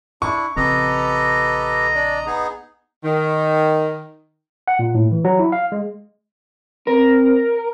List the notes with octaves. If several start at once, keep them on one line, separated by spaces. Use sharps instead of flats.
D4 E4 C#6
A#1 C#3 C4 G4 A4 B4 D#5 A#5
D4 D5
B3 D#4 G#4
D#3
F#5
A#2
A2
E3
F#3
E4
F5
G#3
C4 A#4